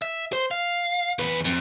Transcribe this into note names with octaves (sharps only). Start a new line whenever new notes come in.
E5
C5
F5
E2 B4
F2